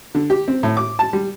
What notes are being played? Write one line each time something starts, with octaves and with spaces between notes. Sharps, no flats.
D3
G4
C4
A2
D6
A5
G3